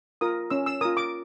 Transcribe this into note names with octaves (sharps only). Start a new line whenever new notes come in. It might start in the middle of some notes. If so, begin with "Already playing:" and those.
F4 A#4 D#6
C#4 E6
E6
F4 A#4 D#6
D6